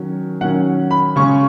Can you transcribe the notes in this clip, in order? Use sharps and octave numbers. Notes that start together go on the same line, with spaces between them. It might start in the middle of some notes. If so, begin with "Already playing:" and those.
Already playing: D#3 F#3 C#4
D#3 F#3 C#4 F#5
B5
C#3 G#3 C#4 C#6